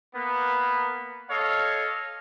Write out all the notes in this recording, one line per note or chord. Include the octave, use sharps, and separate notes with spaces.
A#3 B3
A4 C#5 D#5 F5